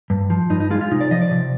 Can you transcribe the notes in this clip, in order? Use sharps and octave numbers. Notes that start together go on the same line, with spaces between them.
G2
F3
G2 D#4
D#4
G#3 F4
F4
C3 D#4
D5
F3 D#5
D5
C3